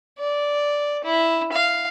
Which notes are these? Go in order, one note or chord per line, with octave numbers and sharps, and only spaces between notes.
D5
E4
F5